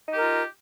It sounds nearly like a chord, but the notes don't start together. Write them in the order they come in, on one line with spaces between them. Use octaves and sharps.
D#4 G4 A#4 F4